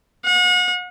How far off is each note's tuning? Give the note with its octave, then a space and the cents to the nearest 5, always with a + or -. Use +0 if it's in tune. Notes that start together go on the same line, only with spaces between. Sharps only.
F#5 -40